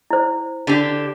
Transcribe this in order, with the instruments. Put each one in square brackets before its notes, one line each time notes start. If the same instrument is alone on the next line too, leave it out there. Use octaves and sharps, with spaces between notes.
[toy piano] E4 C5
[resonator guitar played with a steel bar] D3 G4